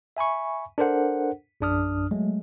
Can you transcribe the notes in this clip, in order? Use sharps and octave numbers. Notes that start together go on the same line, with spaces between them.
E5 G#5 B5 C#6
D4 A4 A#4 C5 F#5
A#1 F#2 D4 D#6 F6
F#3 G#3 A3